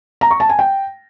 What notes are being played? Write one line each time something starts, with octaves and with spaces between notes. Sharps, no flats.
A#5
C#6
A5
G#5
G5